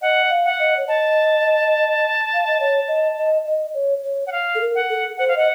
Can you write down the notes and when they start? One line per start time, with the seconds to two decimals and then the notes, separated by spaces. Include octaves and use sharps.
0.02 D#5 F#5
0.30 F5
0.45 F#5
0.59 D#5
0.77 C#5
0.88 D#5 A5
2.34 F5
2.47 D#5
2.60 C#5
2.88 D#5
3.18 D#5
3.46 D#5
3.74 C#5
4.04 C#5
4.27 F#5
4.32 F5
4.55 A4
4.61 A#4
4.75 F#5
4.90 A4
5.17 C5 F#5
5.28 F5
5.36 D#5 F#5